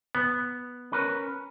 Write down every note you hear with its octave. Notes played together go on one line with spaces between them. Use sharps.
B3
C#4 A#4 B4